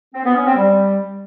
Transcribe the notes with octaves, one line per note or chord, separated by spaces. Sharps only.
C4
B3
C#4
C4
G3